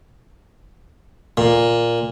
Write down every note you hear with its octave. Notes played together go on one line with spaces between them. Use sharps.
A#2